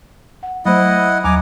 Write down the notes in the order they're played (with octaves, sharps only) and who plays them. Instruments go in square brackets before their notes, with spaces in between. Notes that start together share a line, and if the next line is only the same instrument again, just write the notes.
[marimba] F#5
[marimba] F#3 A3 C5 [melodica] E4 D#5 F#5
[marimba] D#2 F#3 [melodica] G#5 A#5 D6